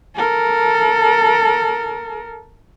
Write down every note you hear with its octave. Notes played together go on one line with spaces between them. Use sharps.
A4 A#4